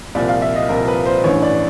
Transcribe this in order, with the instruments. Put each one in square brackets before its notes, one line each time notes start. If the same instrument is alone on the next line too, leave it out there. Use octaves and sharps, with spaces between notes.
[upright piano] C2 A#2 F3 D5
F5
E5
D#5
C2 A#2 F3 A#4
B4
C5
A1 G2 E3 C#5
D5